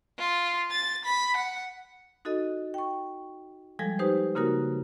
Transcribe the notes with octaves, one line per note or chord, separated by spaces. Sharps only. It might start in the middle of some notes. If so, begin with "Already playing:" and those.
F4
A6
B5
F#5
D#4 F#4 A4 D#5
G5 C#6
F3 G3 G#3 A4 G#6
D#4 G4 B4 C5
C#3 A#3 D#4 F#4 A#4